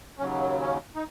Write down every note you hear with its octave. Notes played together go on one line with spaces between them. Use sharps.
D#2 C#3 F#3 C#4
C#4
D#4